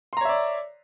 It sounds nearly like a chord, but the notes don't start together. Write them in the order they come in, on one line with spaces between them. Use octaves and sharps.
C6 A#5 C#5 E5 D5